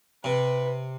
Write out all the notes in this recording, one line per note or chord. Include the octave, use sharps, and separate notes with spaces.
C3 B4